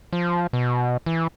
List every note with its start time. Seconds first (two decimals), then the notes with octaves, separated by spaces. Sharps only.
0.13 F3
0.53 B2
1.06 E3